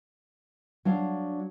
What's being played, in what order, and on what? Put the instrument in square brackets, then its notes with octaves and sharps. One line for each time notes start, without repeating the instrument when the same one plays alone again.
[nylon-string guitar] F#3 D4 F5